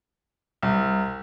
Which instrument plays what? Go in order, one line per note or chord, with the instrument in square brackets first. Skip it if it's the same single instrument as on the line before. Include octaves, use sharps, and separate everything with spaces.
[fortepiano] C2